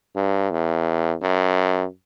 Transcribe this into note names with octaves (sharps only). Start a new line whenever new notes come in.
G2
E2
F#2